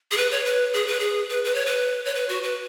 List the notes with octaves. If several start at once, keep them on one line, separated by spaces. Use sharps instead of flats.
G#4
B4
C#5
B4
G#4
B4
G#4
B4
B4
C#5
B4
C#5
B4
F#4
B4